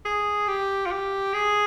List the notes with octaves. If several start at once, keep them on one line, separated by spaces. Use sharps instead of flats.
G#4
G4
F4
G4
G#4